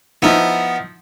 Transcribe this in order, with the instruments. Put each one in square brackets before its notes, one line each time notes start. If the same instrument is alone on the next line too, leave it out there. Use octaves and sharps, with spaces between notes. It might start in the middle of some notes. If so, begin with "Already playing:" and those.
[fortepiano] F3 D#4 E4 [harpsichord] B3